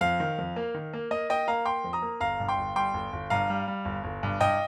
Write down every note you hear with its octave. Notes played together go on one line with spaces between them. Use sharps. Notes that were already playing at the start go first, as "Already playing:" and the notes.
F2 F5
D#3
F2
A#3
D#3
A#3
A#3 D#5
A#3 D#5 G5
A#3 F5 A#5
A#3 G5 C6
F2
A#5 D#6
A#3
G1 F5 A#5
G2
G5 C6
G1
G3 G5 C6
G1
G1
G2 F5 A#5
G3
G3
G1
G1
G2
G2 D#5 G5